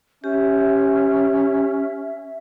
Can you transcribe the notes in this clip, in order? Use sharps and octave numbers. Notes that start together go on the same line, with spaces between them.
C#4 G4 E5